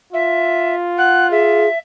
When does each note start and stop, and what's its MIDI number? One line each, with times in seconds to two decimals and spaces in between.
0.13 1.70 65
0.13 0.74 76
0.98 1.29 78
0.98 1.27 90
1.31 1.68 68
1.31 1.78 76